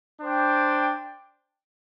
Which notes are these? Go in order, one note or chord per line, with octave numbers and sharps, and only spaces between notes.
D4 C5 G5